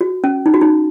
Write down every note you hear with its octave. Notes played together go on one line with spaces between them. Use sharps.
F#4
C#4
D#4
F#4
D#4